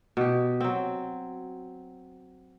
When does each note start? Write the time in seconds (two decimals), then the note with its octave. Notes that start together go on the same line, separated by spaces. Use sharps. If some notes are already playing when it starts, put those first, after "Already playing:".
0.17 B2 G4
0.60 F#3 C4